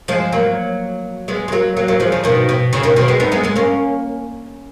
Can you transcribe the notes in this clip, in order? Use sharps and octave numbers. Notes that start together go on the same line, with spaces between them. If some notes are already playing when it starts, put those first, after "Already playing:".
F3 G#3
F#3 A#3
G#3 B3
G#3
F#3 A#3
F#3 A#3
F#3 A#3
F3 G#3
C#3 F3
B2 D#3
B2
C#3
B2 D#3
B2 D#3
G#3 B3
B3 D#4
G#3 B3
G#3 B3
A#3 C#4